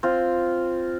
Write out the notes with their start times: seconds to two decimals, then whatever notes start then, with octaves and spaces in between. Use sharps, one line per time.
0.03 C4 F4